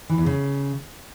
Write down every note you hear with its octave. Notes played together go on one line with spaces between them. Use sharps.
E3
E2
C#3